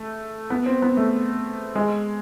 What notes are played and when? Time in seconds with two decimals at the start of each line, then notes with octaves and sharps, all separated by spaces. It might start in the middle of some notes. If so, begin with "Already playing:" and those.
Already playing: A3
0.50 B3
0.66 C4
0.82 B3
0.97 A3
1.75 G#3